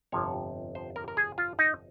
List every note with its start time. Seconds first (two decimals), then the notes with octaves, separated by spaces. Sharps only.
0.12 G1 F2 C3 F3 C#5
0.75 C5
0.96 A#4
1.08 A#4
1.17 G#4
1.38 F4
1.59 D#4